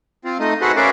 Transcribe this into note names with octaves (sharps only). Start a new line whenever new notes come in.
C4 F4
A3 D#4 D#5
F#4 G#4 A4 B4 C5 F#5
C#4 A#4 B4 D5 E5 F5